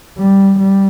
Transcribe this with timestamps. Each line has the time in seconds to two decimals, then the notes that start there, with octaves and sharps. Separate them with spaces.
0.18 G3
0.60 G3